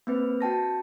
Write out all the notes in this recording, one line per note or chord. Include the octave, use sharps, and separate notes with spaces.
A#3 C4 B4
F#4 G5 A5 A#6